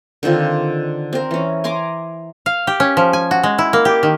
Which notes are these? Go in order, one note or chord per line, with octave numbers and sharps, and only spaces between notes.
D3 D#3 C4 F4
C4 A#4
E3 C#4
G#5 A#5 C6 D6
F5
G4
C#4
F3
G#5
F#4
G#3
E4
A#3
G4
D#3